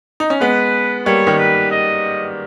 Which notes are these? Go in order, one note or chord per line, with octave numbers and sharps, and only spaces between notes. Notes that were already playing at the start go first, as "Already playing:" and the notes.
D#4
C#4
G#3 B3 B4
G3 A#3 C#5
D#3 G3
B4
D#5